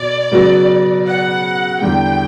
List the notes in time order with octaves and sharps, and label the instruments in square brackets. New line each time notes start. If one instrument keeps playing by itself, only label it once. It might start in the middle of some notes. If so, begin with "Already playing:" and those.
Already playing: [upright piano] B2 [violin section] D5
[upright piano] C#3 F#3 B3 F#4
[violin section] F#5
[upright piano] E2 D3 G3 [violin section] G5